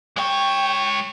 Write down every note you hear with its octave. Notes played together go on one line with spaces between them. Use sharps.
G#3 C#5 G5